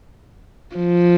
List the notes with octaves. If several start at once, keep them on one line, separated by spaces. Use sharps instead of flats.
F3